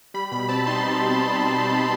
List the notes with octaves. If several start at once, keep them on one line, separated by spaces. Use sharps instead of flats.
G3 B5
B2 B5
C4 A5
D#4 C6
G3